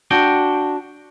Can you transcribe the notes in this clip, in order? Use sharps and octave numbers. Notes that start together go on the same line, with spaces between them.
D4 F#4 G5